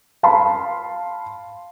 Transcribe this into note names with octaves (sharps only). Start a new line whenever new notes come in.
F5 A5 B5 C6